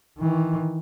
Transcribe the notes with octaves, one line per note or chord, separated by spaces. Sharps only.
D#3 E3